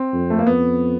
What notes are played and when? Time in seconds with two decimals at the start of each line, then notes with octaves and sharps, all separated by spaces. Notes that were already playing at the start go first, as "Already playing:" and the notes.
Already playing: C4
0.13 F2
0.30 A3
0.39 A#3
0.46 F2 B3